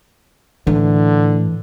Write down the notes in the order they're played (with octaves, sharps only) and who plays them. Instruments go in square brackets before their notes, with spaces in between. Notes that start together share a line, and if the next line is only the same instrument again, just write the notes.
[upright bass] A2 [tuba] D3 [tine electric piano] E3